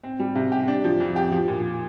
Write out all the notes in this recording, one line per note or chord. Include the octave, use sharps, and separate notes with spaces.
C4
G3
C3
G4
D4
F3
F2
G4
F3
A#2